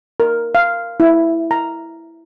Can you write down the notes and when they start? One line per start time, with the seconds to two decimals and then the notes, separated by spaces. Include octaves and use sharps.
0.20 A#4
0.55 F5
1.00 E4
1.51 A#5